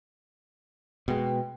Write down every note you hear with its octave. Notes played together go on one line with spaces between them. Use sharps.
B2 G#3 B4 G5